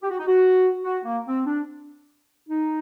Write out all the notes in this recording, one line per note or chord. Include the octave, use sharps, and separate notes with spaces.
G4
F#4
D#4
F#4
F#4
A#3
C4
D4
D#4